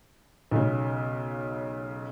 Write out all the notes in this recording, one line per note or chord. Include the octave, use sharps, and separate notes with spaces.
B1 C#3